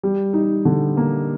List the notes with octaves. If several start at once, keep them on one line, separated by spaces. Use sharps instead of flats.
G3
D#4
D3
A#3